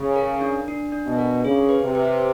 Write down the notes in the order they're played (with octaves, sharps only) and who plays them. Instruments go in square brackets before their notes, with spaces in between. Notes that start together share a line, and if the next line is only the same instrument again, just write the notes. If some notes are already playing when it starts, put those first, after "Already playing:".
Already playing: [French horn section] C#3
[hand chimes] A#4
D4
D4
D4
[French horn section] B2
[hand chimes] A#4
[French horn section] C#3 [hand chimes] G#4
[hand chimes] B4
[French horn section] C3
[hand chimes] B4